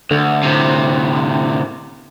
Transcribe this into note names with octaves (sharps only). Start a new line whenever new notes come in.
D2 D3
A2 C3